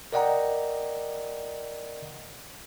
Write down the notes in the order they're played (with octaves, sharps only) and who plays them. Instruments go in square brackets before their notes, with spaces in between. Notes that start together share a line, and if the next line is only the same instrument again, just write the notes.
[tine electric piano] A#4 D5 D#5 F#5 G5 A#5